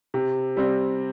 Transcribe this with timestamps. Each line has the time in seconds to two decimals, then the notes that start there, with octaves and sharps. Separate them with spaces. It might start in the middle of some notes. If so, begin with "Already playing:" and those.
0.14 C3
0.57 G3 C4